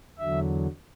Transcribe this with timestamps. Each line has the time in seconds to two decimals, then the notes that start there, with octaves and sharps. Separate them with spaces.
0.19 E2 D3 F#3 E5